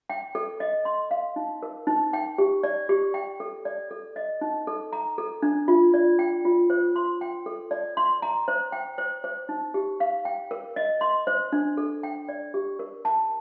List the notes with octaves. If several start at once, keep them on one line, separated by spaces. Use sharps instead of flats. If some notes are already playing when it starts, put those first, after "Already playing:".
G5
A4
D#5
C6
F5
D#4
A#4
D#4
G5
G4
D5
G4
G5
A4
D5
A4
D#5
D#4
A4
A#5
A4
D4
F4
D5
G5
F4
C5
C6
G5
A4
D5
C6
A#5
C5
G5
C5
C5
D#4
G4
F5
G5
A#4
D#5
C6
C5
D4
A4
G5
D5
G4
A#4
A5